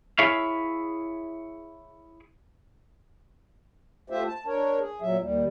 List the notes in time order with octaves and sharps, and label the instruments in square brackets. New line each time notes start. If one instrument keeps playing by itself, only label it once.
[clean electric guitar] E4 G#4 C#5 E5 F5
[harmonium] A3 F4 G4 C5 E5
A5
D4 A#4 C#5
G#4
A#2 F#3 E5
D#2 G3